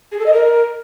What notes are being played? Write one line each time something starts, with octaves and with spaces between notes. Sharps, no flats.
G#4
A4
D#5
A#4